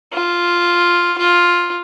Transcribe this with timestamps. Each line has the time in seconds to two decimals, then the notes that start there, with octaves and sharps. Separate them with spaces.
0.13 F4
1.18 F4